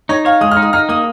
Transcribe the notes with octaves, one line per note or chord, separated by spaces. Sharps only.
D#4 C#5
C#5 F5
G#3 D#6
F6
D#4
D#6
D#4 F6
A#3 D#6